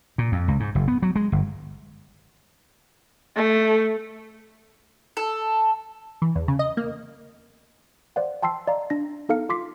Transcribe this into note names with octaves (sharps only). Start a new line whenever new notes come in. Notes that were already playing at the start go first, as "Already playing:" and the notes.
A#2
F2
C#2
G#2
F#1
B3
F#3
G#3
G1
A3
A4
E3
E2
C#3
D#5
A#3
C5 D5 F5 F#5
G5 A5 C6 E6 C7
D5 D#5 F5 A#5
D4 A#6
B3 D#4 A4 F5 F6 C#7
F4 C6 D6 B6 C7